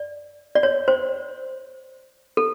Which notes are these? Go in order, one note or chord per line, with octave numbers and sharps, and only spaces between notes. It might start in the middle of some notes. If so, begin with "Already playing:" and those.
Already playing: D5
D5
C#5
C5
A4